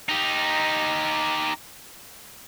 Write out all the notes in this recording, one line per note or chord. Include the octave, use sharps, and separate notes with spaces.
D#4 G4